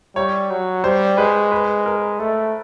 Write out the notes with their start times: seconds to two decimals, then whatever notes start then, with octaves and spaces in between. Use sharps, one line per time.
0.16 G3 C#5
0.51 F#3
0.84 G3 C5
1.18 G#3 B4
1.51 B4
1.86 A#4
2.19 A3 A4